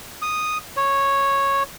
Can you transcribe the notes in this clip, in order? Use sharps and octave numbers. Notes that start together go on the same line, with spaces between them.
D#6
C#5